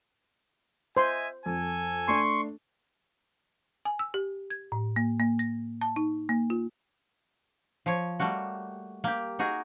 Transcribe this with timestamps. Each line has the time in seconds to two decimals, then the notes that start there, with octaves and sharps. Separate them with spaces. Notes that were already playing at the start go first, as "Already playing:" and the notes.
0.97 C5 D#5 E5 G#5 C6
1.46 F2 A4 G#5
2.08 A3 D4 C6 C#6
3.85 G#5
3.99 E6
4.14 G4
4.50 G#6
4.72 A2
4.96 A#3
5.20 A#3
5.39 A#6
5.81 A5
5.96 D#4
6.29 A#3
6.50 F4
7.86 F3 C#5
8.19 G3 A3 A#3 F#4
9.04 A#3 G4
9.39 D#4 F#4 G#4 A#4